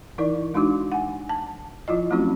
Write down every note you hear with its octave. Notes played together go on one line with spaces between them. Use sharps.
E3 D#4 E4 A#4 D5
G#3 D4 D#4 F#4 D6
F#5 G#5
A5
F3 E4 F4 D#5
F#3 A3 C4 C#4 E4 F#4